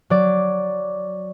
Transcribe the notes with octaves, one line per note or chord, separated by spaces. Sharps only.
F#3 D5